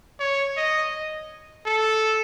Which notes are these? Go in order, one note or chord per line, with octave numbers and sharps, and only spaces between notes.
C#5
D#5
A4